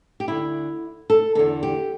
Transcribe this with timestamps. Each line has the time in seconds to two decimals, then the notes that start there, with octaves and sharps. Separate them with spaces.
0.20 G4
0.28 D2 D3 E4
1.10 A4
1.35 E2 D3 A4
1.63 G4